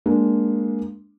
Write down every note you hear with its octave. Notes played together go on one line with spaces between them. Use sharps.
G#3 A#3 D4